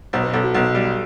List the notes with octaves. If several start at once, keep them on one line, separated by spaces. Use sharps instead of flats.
B1 C5
B4
B1 A4
F#4
B1
G3